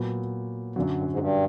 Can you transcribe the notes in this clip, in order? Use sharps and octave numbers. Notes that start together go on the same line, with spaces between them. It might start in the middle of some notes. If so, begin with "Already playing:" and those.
Already playing: A#2 F#3 B3
F#2 A#2 D3 F#3
G2
G#2
G2